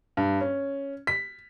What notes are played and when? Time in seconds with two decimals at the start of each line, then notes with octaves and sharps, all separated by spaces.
0.17 G2
0.41 C#4
1.07 B6